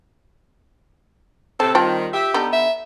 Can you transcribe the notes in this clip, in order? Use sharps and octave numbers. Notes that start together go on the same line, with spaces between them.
A2 C3 C4 A4 A5
D#3 G3 F4 G5 A5
G4 E5
D3 B3 D#4
E5